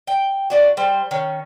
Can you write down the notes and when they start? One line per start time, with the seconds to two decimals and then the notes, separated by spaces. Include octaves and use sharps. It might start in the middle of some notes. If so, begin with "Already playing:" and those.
0.07 G5
0.50 A#2 D4 F#4
0.77 G3 C5
1.11 D#3 C#4